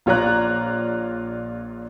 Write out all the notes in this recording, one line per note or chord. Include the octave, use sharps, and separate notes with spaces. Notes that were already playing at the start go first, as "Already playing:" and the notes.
A#1 F4 C#5 D5 A#5 F#6